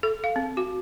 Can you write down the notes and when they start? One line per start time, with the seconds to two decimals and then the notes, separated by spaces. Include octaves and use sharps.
0.03 A4
0.24 F5
0.36 C4
0.57 F#4